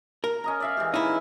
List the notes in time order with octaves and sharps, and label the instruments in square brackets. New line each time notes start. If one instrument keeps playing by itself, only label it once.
[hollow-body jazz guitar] A#4
[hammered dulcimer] C#4 D#5 A#5
D5 E5 F5
E3 G#3 G4
[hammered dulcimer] C#4 [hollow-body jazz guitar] D#4 E4